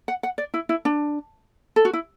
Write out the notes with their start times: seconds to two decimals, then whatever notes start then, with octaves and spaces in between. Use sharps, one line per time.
0.08 F#5
0.23 F#5
0.38 D5
0.54 E4
0.69 E4
0.85 D4
1.76 A4
1.85 F#4
1.93 E4